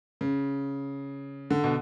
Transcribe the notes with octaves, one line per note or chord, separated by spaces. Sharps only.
C#3
D3
B2